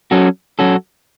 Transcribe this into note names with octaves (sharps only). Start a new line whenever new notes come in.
F#3 C#4 F#4 A4
F#3 C#4 F#4 A4